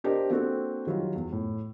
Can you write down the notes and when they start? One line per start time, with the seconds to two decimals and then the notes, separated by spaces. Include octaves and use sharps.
0.04 D4 G4 A#4 C5 D5 D#5
0.30 A#3 C4 D4 F#4 A4
0.87 D#3 F#3 G3 F4
1.15 E2
1.32 A2